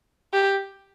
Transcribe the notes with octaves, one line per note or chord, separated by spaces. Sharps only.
G4